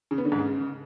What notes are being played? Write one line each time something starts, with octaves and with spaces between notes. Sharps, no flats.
C#3
B3
D3
G#2
C#3